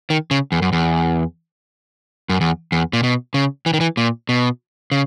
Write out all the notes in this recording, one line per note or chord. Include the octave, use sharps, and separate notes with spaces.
D#3
C#3
E2
F#2
E2
F#2
E2
E2
A#2
B2
C#3
E3
D#3
E3
A#2
B2
C#3